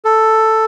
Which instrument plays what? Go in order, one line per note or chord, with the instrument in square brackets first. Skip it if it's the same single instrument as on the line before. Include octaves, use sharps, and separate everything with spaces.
[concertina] A4